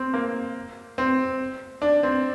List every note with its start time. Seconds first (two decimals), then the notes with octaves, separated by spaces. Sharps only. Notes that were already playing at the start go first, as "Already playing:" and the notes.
Already playing: C4
0.14 A#3
0.98 C4
1.82 D4
2.03 C4